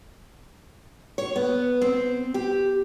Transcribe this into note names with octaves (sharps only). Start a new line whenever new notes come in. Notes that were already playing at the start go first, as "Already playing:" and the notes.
C#5
B3
C4
G4